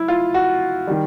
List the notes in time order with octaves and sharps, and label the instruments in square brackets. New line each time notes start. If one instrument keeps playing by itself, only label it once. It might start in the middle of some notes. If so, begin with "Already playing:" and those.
Already playing: [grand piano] F#3 E4
F4
F#4
D#3 G3